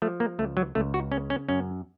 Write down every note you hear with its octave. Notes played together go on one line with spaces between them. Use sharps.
F3 A3
A#3
C#2 A3
F#3
C#2 A3
F#4
C#3 C#4
C#4
F#2 C#4